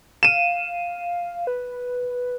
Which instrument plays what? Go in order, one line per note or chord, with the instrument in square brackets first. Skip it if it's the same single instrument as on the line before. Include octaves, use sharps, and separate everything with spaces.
[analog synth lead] F5 [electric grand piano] D#7 E7
[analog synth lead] B4